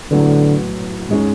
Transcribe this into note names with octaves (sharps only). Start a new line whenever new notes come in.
A2 D3 F#3 B3
G#2 G#3 C#4